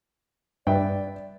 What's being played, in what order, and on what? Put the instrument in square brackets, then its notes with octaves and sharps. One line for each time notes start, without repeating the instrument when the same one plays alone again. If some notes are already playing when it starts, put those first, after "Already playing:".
[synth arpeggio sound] G2 [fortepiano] B4 E5 G5 [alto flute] D5